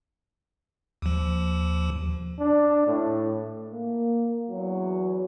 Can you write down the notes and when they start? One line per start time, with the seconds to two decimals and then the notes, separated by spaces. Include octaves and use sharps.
1.02 D#2 F3
2.39 D4
2.87 A2
3.72 A#3
4.49 E2 F#3